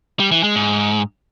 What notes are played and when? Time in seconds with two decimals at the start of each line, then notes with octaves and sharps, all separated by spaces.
0.20 G3
0.32 E3
0.44 G#3
0.55 G#2